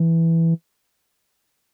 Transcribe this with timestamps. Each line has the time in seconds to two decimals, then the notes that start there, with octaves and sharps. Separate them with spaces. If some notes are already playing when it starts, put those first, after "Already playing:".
Already playing: E3